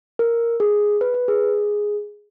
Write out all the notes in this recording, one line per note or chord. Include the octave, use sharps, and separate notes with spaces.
A#4
G#4
B4
B4
G#4